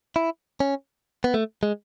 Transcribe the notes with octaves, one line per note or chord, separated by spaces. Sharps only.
E4
C#4
B3
A3
G#3